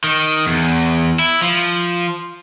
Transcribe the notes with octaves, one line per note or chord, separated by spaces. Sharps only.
D#3
E2
E4
F3